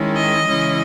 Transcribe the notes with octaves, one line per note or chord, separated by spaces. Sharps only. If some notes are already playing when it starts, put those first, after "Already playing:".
Already playing: D#3 G#3 C#4 E4
D#5
C#3 E3 G#3 C#4 E4